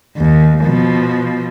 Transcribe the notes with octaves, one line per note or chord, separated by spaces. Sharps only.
D#2
B2 F3